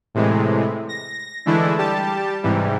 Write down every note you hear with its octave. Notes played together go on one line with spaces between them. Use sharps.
A2 C3 E3 G#3
A#6
D3 E3 G#3 A3 D4 E4
G3 G4 A5
G#2 C3 E3 G3